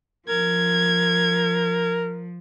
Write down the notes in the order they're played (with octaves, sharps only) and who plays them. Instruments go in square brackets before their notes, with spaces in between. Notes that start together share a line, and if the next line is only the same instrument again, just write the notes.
[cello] F3 [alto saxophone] A#4 [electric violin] G#6